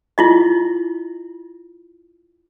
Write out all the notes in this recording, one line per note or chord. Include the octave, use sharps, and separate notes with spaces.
E4 F4 D#5